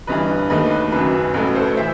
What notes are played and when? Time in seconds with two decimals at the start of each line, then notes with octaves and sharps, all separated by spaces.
0.07 G1 G2 E3 B4 D#5
0.50 D#2 D#3 A3 B4 D#5
0.71 B4
0.92 F#1 F#2 F#3 B4
1.34 A1 A2 F#3 A3 B4
1.55 A4 C5
1.77 E3 C5 E5